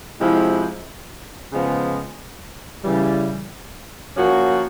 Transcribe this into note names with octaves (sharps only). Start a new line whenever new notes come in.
C3 F3 G#3 C4 E4
C#3 F3 G#3 B3
C#3 E3 G3
F3 A#3 C#4 F#4